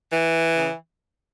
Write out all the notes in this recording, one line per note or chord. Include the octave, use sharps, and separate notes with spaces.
E3
C#3